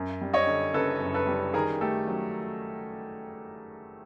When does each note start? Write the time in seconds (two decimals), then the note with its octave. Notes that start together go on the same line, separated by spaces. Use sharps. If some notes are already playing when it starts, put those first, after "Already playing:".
Already playing: F#2
0.21 G3
0.33 C#5 D#5
0.47 D3
0.74 F#1 A4 B4
1.01 F#2
1.14 A4 B4
1.27 G3
1.54 D#3 G#4 A#4
1.81 A3 G4 A4
2.07 F#3